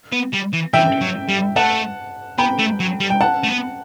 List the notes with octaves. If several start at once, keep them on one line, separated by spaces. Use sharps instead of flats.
B3
G3
E3
E3 E5 G5
F#3
G3
A3 F#5 A5
B3 G5 B5
A3
F#3
G3
G5
F#5 A5
A3
B3